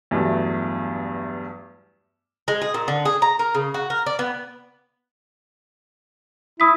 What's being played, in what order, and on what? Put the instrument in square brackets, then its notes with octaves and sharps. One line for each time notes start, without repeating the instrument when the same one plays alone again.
[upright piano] E2 G2 F#3 A3
[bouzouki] G#3
G#4
A#2
D3
G#4
A#5
A#4
C#3
F#4
A#4
D5
B3
[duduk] E4 [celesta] D#6 B6